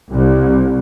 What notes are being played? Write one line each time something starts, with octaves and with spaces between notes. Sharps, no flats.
C2